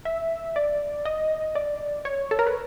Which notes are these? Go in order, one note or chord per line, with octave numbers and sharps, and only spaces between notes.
E5
D5
D#5
D5
C#5
A4
A#4
B4